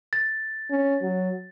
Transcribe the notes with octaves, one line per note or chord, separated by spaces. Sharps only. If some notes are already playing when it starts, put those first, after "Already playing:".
A6
C#4
F#3